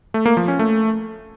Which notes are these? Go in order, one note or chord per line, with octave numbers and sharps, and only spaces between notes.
A3
A#3
F3
C#4
A3